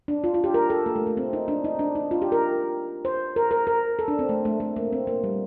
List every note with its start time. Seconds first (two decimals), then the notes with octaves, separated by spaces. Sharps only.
0.08 D4
0.24 F4
0.34 F4
0.44 G4
0.54 A#4
0.70 A4
0.86 A#3
0.96 A3
1.06 A3
1.17 C4
1.33 D#4
1.48 D4
1.64 D#4
1.79 D4
1.95 D#4
2.11 F4
2.22 G4
2.32 A#4
3.05 C5
3.36 A#4
3.51 A#4
3.67 A#4
3.99 A4
4.08 D4
4.19 C4
4.29 A3
4.45 A3
4.60 A3
4.76 A#3
4.93 C4
5.07 A#3
5.24 G3